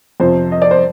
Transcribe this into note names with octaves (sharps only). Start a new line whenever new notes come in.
F2 C3 F3 C5
D#5
D5
C5